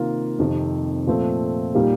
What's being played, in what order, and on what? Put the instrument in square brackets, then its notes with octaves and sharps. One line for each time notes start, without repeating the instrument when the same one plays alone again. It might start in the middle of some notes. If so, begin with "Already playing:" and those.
Already playing: [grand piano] C3 D#3 A#3 F4
F2 C3 D#3
A#2 F3 A3 C4
A#2 G3 A#3 D#4 G4